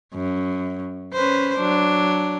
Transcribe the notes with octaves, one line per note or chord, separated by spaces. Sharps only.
F#2
C#4 B4 C5
F#3 D4